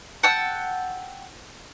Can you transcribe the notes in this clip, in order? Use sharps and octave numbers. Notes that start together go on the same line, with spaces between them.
F#5 G5 A5 E6